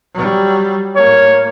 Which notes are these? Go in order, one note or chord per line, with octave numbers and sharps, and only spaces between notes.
F#3 G3
A2 A#3 C#5